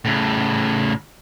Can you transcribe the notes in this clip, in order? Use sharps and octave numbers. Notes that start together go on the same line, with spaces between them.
A2 C#3